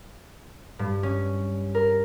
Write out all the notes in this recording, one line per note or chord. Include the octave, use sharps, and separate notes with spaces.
G2
C#4
A#4